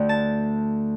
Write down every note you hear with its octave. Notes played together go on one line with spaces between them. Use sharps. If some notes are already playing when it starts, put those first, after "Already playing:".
Already playing: D2 D3 A3 G5
A5